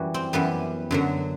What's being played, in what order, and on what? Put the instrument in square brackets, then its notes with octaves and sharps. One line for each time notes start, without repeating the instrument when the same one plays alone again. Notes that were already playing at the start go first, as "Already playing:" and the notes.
Already playing: [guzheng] F#2 E3 G3 F#4
C4
F#2 E3 G3 B3
F#2 D3 F#3